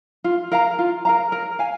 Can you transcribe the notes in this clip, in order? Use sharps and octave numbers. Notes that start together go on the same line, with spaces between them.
F4
A#4 F5 A#5
F4
A#4 F5 A#5
A#4
F5 G#5